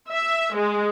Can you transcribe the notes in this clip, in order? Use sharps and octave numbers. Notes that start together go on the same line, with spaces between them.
E5
G#3